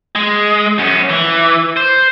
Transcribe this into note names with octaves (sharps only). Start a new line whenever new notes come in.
G#3
F#2 C#4
E3
C5